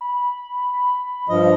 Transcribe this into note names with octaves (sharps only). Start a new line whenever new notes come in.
B5
G2 F3 D#5